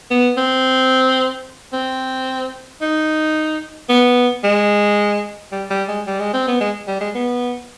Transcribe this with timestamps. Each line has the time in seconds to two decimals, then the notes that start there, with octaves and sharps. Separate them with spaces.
0.10 B3
0.37 C4
1.73 C4
2.82 D#4
3.89 B3
4.44 G#3
5.52 G3
5.70 G3
5.88 G#3
6.07 G3
6.20 G#3
6.33 C4
6.47 B3
6.60 G#3
6.87 G3
7.00 G#3
7.15 B3